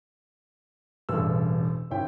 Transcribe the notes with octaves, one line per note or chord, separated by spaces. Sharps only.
E1 A1 G2 A4 E6
G#1 C#4 E4 G5